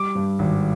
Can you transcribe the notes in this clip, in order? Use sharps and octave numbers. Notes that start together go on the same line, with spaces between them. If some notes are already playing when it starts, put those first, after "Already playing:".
Already playing: G3 D6
G2
G#1